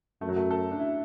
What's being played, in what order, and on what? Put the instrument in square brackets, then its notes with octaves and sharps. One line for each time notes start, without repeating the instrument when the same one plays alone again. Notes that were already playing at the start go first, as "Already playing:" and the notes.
[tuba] F#2 [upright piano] A3
[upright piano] F#3
A3
A4
D4
E4